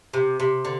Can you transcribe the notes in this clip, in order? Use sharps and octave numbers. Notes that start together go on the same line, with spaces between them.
C3
C3
D3